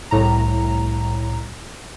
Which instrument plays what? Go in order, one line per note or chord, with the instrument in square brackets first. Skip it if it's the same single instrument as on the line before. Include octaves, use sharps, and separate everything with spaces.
[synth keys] C2 A2 A#5